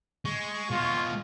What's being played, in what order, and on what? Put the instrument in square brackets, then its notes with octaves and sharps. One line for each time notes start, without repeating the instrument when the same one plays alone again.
[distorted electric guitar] G#3 [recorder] C#6
[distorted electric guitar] B2 G#3 [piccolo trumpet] F4